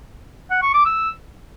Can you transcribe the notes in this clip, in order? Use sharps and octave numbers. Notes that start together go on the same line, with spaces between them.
F#5
C#6
D6
E6